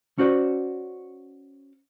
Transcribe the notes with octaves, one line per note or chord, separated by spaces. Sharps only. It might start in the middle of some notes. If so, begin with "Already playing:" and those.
C#4 F#4 C5 D5